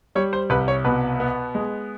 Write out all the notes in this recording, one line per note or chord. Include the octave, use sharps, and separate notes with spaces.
G3 C#5
C5
C2 B4
C#5
B2 B4
B3
G#3